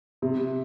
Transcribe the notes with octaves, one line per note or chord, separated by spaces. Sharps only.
C3